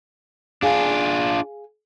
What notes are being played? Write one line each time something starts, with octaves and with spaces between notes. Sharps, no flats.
D4 F4 G#4 F5 G#5